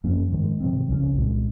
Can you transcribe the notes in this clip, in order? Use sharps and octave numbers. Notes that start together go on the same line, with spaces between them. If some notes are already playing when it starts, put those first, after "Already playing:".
F#2 F3 A#3 C#4
G#2 D#3 G#3
C3 F3 C4
C#2 C#3 G#3 C#4
C2 A#2 G#3